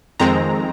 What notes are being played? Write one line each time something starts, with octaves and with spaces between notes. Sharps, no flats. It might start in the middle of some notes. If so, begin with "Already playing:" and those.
F2 D#3 G#3 C4 A#5